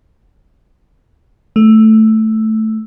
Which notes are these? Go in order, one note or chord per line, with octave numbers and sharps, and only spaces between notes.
A3